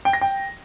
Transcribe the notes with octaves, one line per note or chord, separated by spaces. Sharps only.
G5
A#6
G5